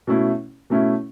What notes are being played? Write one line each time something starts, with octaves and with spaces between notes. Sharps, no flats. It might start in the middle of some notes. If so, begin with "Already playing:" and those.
B2 A3 C#4 E4
B2 A3 C#4 E4